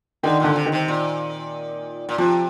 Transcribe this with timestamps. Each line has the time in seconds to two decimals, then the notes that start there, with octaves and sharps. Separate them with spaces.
0.23 D3 D#3
0.40 A#2 D3
0.56 C3
0.66 D#3
0.72 C3
0.88 A#2
2.09 A#2
2.18 C3 F3